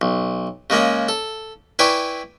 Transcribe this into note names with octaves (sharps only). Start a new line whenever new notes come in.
B1
C#3 G#3 A#3 C#4
A4
E4 B4 D5 G5 G#5 C#6